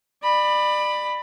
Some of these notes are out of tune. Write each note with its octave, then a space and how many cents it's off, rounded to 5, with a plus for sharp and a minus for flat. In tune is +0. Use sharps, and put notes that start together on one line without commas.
D5 +30 B5 +0